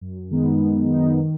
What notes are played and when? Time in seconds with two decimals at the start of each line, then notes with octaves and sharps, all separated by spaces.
0.01 F#2
0.31 D#3 G#3 B3 D#4
0.61 F#2
0.89 D#3 G#3 B3 D#4
1.18 D#3